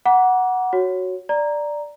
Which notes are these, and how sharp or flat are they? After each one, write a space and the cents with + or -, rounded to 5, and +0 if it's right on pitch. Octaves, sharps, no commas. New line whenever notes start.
F#5 +0 A#5 +35 D6 -15
F#4 +0 C#5 +0
D5 +0 A#5 +0